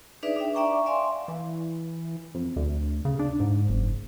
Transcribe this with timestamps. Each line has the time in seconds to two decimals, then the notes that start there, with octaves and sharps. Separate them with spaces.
0.23 D4 D#4 G#4 B4 D5 E5
0.36 D4 E5 G5
0.54 D5 E5 G5 A#5 C#6 D6
0.86 D5 E5 F5 G#5 C6
1.28 E3
2.35 F2
2.56 D2
3.05 C#3
3.19 D4
3.40 G#2
3.69 F#1